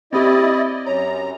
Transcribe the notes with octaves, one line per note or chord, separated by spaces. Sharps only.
C4 E4 G4 D5 D#5
F#2 C#5 A#5